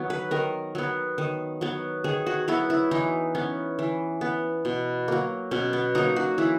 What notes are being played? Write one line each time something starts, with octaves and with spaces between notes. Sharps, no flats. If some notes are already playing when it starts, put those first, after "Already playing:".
Already playing: D#3 F#3 B3 C#5
B4
D#3 A#4
F#3 B3
D#3
F#3 B3
D#3 G#4
F#4
F#3 B3 E4
E4
E3 D#4
B3 C#4
E3
B3
B2
F#3 A#3
B2 C#4
B3
F#3 A#3 D#4
F#4
E3 E4